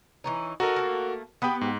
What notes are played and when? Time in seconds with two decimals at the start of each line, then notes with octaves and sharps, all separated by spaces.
0.24 E3 C#4 D#4
0.60 D#4 F#4 A4 A#4
0.76 A3 A#3
1.42 B3 G4 G5 B5 D#6
1.61 G#2